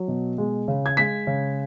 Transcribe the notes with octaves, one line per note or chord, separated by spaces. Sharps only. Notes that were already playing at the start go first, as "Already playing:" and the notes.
Already playing: F#3
B2
G#3
C#3
G#6
G#3 B6
C#3